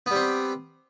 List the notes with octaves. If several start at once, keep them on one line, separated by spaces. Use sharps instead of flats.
G3 B3 C4